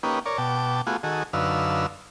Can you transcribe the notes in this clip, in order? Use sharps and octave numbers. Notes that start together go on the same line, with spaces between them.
A#3 C#4 D#4 G4 B4
A#4 C#5 D5
B2 G5 A5 D6
A3 B3 F4 F#4 G#4
D#3 F#4 G#4 A4
F#2 D3 D#4 B4 F5 E6